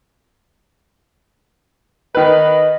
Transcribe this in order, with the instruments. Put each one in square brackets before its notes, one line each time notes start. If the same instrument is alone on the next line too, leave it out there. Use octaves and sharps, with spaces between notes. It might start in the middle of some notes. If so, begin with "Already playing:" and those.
[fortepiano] D#3 B4 [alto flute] D#5